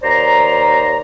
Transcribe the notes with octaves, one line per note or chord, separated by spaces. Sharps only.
D#2 C5 D5 A#5